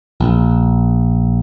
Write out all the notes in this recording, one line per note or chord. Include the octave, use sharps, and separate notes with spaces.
A#1